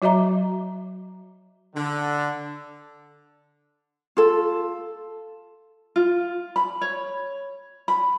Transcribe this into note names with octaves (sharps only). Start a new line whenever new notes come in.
F#3 F#4 D#5 E5 A#5 D6
D3
F4 A4
F4
B5
C#5
B5